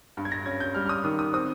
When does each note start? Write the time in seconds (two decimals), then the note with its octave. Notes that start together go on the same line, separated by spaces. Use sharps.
0.17 G2
0.25 G#6
0.32 A#6
0.46 C#4 G#6
0.60 G6
0.74 G3 F6
0.86 F6
0.89 D#6
1.04 D#3 D#6
1.19 D#6
1.33 C4 D#6